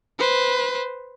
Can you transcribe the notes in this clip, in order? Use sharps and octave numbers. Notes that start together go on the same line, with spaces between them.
B4 C5